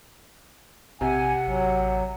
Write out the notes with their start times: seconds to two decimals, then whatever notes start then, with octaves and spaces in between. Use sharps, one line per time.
1.01 A#1 C3 F#5 G#5
1.47 A1 F#3